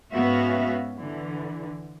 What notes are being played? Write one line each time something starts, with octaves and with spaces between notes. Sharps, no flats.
G#2 B3 C#4 F#4 E5 F5
D3 E3